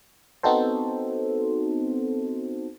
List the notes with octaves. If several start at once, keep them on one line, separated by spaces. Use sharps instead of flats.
B3 C4 D#4 F#4 A4 C5